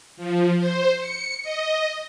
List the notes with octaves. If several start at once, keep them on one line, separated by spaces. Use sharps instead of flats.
F3
C5
C#7
D#5